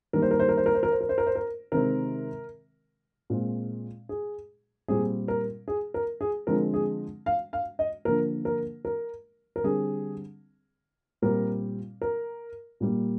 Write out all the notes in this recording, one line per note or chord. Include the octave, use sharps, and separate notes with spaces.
D#3 G3 A#3 A#4
C5
A#4
C5
A#4
C5
A#4
C5
A#4
C5
A#4
C5
A#4
C5
A#4
C3 D#3 G#3 C4 A#4
A#2 G#3 C4
G#4
A#2 G3 C4 G#4
A#4
G#4
A#4
G#4
D3 F3 G#3 C4 A#4
G#4
F5
F5
D#5
D3 F3 A#3 A#4
A#4
A#4
A#4
D3 G3 C4 G#4
A#2 G3 C4 A#4
A#4
A#2 G3 A#3